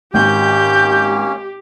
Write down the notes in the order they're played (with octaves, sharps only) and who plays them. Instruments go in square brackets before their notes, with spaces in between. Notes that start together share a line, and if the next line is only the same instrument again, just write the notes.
[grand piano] G#1 [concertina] A#3 C#4 [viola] G4 [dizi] G6